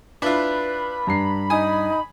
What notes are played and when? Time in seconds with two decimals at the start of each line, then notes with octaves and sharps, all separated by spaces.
0.22 D4 E4 F4 B4 B5
1.07 G2 A#5 C7
1.50 D#4 G#5 D#6